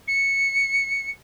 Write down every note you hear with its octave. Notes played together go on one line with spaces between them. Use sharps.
C#7